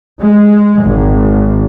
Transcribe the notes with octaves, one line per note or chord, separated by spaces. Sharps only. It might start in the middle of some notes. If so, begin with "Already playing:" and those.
G#3
G#1